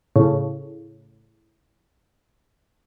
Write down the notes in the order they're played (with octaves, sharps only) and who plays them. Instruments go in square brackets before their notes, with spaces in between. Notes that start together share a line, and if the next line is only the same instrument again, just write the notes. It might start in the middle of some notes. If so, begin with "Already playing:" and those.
[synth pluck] A2 C#3